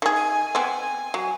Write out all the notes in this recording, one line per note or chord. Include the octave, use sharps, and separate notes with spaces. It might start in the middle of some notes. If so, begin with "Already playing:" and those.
D#3 G#4
G#5
B3 C4
F#3